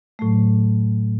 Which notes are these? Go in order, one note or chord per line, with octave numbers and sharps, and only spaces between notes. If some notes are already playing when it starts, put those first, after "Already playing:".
A2 F#3 A3